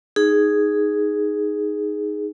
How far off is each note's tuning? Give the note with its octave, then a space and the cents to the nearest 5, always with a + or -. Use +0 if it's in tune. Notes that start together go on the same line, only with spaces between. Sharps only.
D#4 +0 G#4 +0